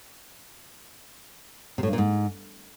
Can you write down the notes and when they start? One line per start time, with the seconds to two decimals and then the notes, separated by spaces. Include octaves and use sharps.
1.78 C3
1.83 A2
1.88 G2
1.93 A#2
1.98 G#2